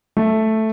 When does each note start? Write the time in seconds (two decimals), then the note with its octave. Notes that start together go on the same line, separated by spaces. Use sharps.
0.17 A3